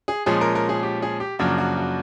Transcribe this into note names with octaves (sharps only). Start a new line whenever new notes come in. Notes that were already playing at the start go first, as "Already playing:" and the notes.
G#4
A#2 F3 G#3 C#4 G#4
A#4
A#4
G#4
G4
G#4
G4
F#2 C#3 F3 A#3 D4 F#4
F#4
F#4